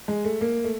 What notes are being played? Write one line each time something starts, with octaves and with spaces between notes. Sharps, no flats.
G#3
A3
A#3
A3